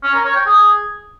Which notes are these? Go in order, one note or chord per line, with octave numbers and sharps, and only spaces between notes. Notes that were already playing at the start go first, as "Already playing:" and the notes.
C#4
A#4
C#5
G5
G#4